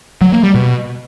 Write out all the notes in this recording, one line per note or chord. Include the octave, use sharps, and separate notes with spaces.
F#3
A#3
G3
B2